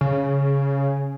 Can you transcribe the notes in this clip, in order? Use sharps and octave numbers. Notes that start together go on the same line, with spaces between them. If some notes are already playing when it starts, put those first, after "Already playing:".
C#3